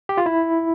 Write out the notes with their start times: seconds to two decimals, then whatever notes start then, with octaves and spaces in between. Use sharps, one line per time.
0.09 G4
0.18 F4
0.26 E4